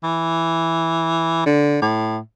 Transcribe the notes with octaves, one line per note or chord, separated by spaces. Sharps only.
E3
D3
A2